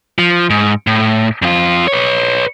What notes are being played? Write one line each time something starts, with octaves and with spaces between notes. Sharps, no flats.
F3
G#2
A2
F2 F4
B4 C#5